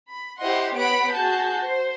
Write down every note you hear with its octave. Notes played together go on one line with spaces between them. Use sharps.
B5
E4 G4 C5 D#5 F#5 C6
B3 C#5 F#5 B5 D7
F#4 G#4 A5 G6
C5